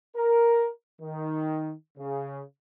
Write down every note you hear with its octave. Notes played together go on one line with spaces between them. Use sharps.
A#4
D#3
C#3